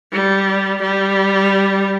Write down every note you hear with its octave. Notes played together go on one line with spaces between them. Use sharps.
G3
G3